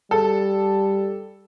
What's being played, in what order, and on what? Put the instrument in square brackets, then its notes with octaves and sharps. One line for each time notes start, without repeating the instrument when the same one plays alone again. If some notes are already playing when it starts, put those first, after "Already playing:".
[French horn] G3 [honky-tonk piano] A4